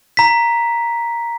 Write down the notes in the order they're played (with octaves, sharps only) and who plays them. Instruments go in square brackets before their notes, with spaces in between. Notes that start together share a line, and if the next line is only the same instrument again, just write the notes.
[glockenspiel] A#5 B6